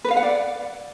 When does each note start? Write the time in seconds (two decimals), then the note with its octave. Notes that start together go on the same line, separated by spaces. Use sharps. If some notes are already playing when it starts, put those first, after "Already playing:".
0.05 B4
0.11 F5
0.17 F#5
0.23 D5